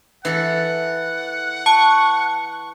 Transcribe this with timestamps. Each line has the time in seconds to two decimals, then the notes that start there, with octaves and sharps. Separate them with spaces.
0.25 E3 A4 F#5
1.66 A5 C#6